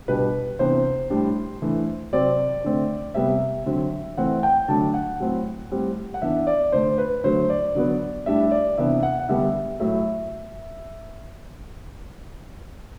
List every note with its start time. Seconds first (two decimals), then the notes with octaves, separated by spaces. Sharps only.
0.08 B2 G3 D4 B4
0.59 C3 E3 B3 D4 C5
1.10 A2 G3 D4
1.62 E3 A3 D4
2.13 C3 F#3 C4 D5
2.64 D3 A3 C4
3.14 C3 G3 B3 E5
3.66 D3 F#3 C4
4.17 E3 A3 C4 F#5
4.43 G5
4.68 D3 F#3 A3 D4 A5
4.94 F#5
5.20 A2 F#3 C4
5.71 A2 G3 C4
6.14 F#5
6.22 E3 B3 D4 E5
6.47 D5
6.72 D3 A3 D4 C5
6.98 B4
7.24 D3 F#3 A3 C5
7.50 D5
7.75 D3 F#3 B3
8.26 A2 G3 D4 E5
8.51 D5
8.78 C3 E3 B3 D4 E5
9.03 F#5
9.19 F#5
9.29 D3 G3 B3 D4 E5
9.80 A2 F#3 A3 E5